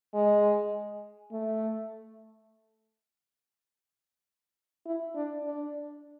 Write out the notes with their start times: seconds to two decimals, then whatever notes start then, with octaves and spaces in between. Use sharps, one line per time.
0.14 G#3
1.32 A3
4.86 E4
5.15 D4
5.44 D4